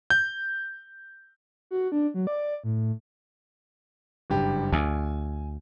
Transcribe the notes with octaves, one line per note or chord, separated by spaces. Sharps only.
G6
F#4
D4
F#3
D5
A2
F#1 G2 G4
D2 G#5